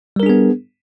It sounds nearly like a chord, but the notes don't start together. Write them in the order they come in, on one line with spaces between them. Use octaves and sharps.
G3 A#4 D4 G#4 B3